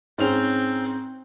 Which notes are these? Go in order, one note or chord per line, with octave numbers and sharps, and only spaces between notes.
G#2 C4 C#4 F7